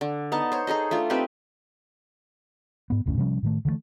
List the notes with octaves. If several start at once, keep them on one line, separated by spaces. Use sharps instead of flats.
D3
B3 D#4 A5
C5 C#5
D#4 G#4 A4 D#5
A3 D4 F4
C4 D#4 G4 B4
G#2 B3
F1 D2 A2 C#4
C3 F3 G3 C#4
A2 D#3 A3
D3 E3 G3 A3